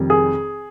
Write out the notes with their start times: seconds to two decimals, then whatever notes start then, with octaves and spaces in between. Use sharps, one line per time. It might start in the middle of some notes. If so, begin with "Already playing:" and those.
Already playing: F1 F2 D#3 G3
0.10 G#4